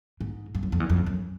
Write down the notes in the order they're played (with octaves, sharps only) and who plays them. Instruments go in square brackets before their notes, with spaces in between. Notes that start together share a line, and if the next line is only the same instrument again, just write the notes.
[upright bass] G#2
G2
F#2
F2
E2
F2
F#2